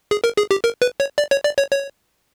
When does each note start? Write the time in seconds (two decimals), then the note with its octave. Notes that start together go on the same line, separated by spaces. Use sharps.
0.11 G#4
0.24 A#4
0.37 G#4
0.51 G4
0.64 A#4
0.82 B4
1.00 C#5
1.18 D5
1.31 C#5
1.44 D5
1.58 C#5
1.71 C#5